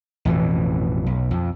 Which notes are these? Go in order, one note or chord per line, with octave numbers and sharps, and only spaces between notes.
A1 F2 B2 E3
B1
F2